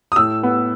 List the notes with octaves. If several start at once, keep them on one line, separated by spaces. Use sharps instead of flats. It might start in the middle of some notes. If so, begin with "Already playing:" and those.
D#6
A2 E6
B3